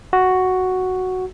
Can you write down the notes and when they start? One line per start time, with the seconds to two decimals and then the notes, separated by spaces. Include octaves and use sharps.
0.13 F#4